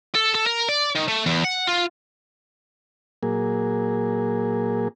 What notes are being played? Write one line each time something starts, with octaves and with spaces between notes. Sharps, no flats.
A4
A4
A#4
D5
D#3
A3
E2
F#5
F4
A#2 F#3 A#3 G#4